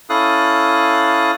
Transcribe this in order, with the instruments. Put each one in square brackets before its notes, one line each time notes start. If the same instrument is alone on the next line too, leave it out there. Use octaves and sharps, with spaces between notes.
[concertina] C#4 E4 A4 F5 D#6 F#6